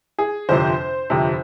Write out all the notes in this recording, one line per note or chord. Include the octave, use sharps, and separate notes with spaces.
G#4
G1 F2 C3 C5
G1 F2 C3